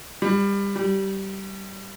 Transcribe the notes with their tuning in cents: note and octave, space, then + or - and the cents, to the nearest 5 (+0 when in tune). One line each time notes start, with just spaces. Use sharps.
G3 +25
G3 -15